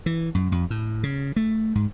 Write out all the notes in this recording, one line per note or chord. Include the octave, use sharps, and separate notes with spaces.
E3
F#2
F2
A2
C#3
A3
G#2